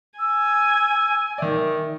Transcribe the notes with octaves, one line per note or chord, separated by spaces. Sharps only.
G#5 E6
D#3 D5 E5